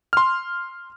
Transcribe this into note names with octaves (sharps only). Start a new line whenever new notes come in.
C6 F6